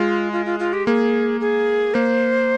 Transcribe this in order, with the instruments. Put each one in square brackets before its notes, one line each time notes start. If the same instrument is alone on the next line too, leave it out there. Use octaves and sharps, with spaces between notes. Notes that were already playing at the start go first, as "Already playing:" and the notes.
Already playing: [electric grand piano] G#3 [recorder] F4
[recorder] F4
F4
F4
G4
[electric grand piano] A#3 [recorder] G#4
[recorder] G#4
[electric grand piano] A#3 [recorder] C5